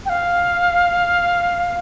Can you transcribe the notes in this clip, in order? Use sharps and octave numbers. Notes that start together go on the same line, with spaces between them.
G5
F5